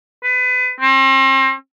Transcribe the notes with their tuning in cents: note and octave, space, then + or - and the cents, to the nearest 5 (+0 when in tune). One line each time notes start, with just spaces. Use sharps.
B4 +30
C4 +40